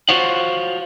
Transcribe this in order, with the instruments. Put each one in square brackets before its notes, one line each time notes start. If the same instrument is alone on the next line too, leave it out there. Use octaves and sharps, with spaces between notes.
[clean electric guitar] F4 F#4 C5 C#5 F5 F#5